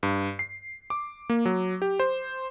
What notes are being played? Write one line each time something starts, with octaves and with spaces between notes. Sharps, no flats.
G2
C7
D6
A#3
F#3
G4
C5